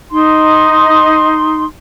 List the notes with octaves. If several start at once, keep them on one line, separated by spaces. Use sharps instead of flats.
D#4 C6